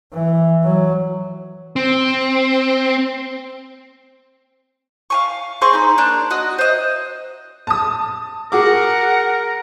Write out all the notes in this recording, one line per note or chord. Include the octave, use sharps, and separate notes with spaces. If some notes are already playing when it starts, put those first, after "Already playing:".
E3
F#3
C4
F5 G#5 C#6
C4 G#4 C6 C#6
D#4 B5
A#3 D4
F#4 D#5
C5 D#5
A5 D#6
F#4 G#4 A#4 F#5 D6